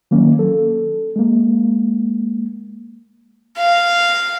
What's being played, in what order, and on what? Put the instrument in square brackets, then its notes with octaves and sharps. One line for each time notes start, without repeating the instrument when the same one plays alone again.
[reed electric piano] D#3 F#3 A#3 C#4
A4
G#3 A#3
[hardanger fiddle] F5